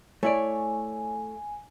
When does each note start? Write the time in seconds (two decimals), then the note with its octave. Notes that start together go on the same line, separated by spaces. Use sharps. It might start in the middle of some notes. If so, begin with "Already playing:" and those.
0.23 A3 E4 C#5 D5 G#5